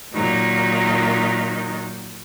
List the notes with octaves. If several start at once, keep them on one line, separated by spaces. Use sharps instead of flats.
A#2 D#3 F#3 D#4